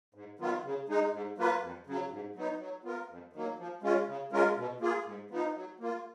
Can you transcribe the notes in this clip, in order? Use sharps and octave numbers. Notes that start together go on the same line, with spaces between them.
G#2
D#3 F#3 B3 F4
C#3
G#3 D#4
G#2
F#3 A#3 F4 B4
F2
C#3 F#3
G#2
F#3 B3 D#4
F#3
B3 F4 A#4
F2
D#3 F#3 A#3
F3
G#3 C#4 F4
C#3
G#3 C#4 F4 A#4
B2
A#3 F4 G#4
G#2
F3 B3 D#4
F#3
A#3 F4